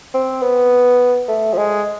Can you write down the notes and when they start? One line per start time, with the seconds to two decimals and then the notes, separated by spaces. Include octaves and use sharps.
0.14 C4
0.42 B3
1.28 A3
1.53 F3
1.57 G#3